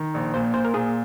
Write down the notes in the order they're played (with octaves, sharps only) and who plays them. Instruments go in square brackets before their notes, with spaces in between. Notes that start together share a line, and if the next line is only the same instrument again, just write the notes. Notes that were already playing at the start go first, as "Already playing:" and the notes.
Already playing: [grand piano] D#3
A#1
[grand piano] A#2 [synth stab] C5
[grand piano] A#2 [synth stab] C5
[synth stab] A#4
[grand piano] A#2 [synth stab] G#4